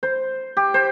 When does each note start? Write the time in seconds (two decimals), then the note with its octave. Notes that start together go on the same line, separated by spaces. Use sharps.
0.03 C5
0.57 G4
0.74 C5